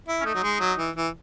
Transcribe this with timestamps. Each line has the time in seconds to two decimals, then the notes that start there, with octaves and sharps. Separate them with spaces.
0.08 E4
0.21 C#4
0.25 A3 D#4
0.35 F#3
0.43 G#3
0.60 F#3
0.78 E3
0.96 E3